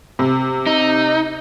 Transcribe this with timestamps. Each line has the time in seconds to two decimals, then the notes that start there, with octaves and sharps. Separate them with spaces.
0.19 C3
0.67 D#4